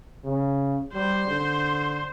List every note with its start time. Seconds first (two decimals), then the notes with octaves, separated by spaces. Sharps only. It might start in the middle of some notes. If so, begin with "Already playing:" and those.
0.24 C#3
0.94 G3 C5
1.27 D3